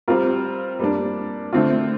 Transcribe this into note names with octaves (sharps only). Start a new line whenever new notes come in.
G3 C4 F4 A#4
G3 A#3 D4
D3 A3 C4 F4